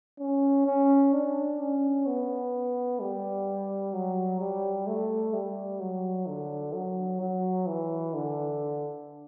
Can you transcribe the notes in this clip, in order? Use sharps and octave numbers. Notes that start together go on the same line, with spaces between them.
C#4
C#4
D4
C#4
B3
G3
F#3
G3
A3
G3
F#3
D3
F#3
F#3
E3
D3